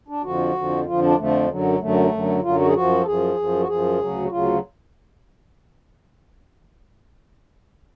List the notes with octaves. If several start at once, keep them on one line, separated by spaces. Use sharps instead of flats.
D4
F2 D3 F3 F#4
F2 D3 F3
F2 D3 F3 F4
D4
F2 D3 F3 A3
F#2 D3 F#3
F#2 D3 F#3 A3
F#2 D3 F#3
F#2 D3 F#3 F4
F#4
G#4
F#2 F3 F#4
A4
F#2 F3 G#4
F#2 F3
F#4
F#2 F3 G#4
D2 C#3 F#3
F#4
D2 C#3 F#3 F4